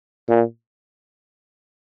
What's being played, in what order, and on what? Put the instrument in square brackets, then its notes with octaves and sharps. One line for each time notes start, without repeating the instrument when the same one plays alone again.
[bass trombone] A#2